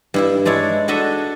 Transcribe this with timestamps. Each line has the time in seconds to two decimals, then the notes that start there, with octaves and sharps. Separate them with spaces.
0.14 G2 E4 E5
0.45 G#3 D4 E4 C#5
0.88 D4 F#4 A4 D#5 E5